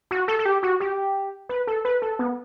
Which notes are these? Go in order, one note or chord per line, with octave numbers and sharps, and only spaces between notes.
F#4
A4
A4
G4
F#4
G4
B4
A4
B4
A4
B3